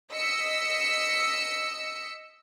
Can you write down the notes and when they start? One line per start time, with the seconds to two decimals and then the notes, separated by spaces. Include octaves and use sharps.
0.13 D#5 E6 B6 C#7